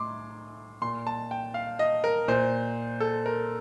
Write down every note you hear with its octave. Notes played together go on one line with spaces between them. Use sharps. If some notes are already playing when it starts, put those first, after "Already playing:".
Already playing: A2 C6 D6
A#2 C6
A5
G5
F5
D#5
A#4
A#2 C5
A4
A#4